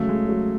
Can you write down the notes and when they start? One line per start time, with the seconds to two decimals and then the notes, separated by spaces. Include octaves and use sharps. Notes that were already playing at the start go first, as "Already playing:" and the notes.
Already playing: C#3 F#3 A3
0.09 G#3
0.29 F#3